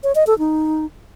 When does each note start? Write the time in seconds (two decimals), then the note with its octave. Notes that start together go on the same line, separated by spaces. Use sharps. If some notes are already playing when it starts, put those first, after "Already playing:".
0.03 C#5
0.15 D#5
0.27 A4
0.39 D#4